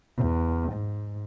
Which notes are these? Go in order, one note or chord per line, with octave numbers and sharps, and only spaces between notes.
E2
G#2